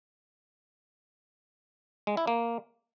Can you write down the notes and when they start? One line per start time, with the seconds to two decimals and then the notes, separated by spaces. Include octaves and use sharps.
2.07 G#3
2.17 E4
2.27 A#3